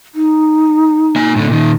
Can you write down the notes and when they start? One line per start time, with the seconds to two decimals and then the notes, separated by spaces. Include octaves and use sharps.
0.15 D#4
1.16 A#3 G#5
1.36 A2 D3
1.48 A#2 D#3